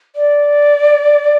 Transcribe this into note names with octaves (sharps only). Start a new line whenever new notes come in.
D5